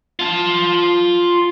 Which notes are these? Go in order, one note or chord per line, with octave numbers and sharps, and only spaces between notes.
F4 A5